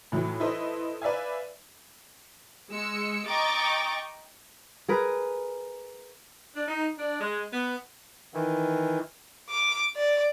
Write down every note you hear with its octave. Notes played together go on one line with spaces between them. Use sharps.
A2 E3 F#3
E4 A4 B4 C5 D#5 E5
B4 D5 E5 F5 G#5
G#3 E6 C#7
D#5 G5 A#5 C#6 D6 A6
G#4 A#4 B4
D4
D#4
D4
G#3
B3
D#3 E3
D6
D5